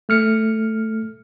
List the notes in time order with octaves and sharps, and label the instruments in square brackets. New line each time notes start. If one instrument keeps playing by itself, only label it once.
[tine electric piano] A3 F6 C#7